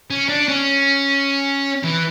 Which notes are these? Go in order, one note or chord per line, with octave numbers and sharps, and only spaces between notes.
C#4
D4
C#4
E3